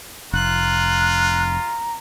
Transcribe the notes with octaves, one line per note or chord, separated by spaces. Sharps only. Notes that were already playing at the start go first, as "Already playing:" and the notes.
F1 F4 A#5 F#6